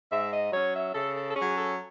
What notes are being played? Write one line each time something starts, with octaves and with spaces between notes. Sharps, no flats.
G#2 E5
D#5
F#3 C#4 C#5
E5
C#3 A4
A4
A4
F#3 C#4 G#4
A4